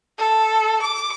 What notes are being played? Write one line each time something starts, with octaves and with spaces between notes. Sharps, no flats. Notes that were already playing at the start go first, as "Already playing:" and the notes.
A4
D6